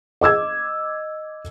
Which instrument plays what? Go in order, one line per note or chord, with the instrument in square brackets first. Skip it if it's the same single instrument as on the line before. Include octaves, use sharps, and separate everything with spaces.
[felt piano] D#5 D6 E6 G#6